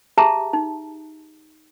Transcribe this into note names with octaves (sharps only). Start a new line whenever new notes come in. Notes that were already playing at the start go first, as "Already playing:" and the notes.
G4 G#4 E5 A5 A#5
D#4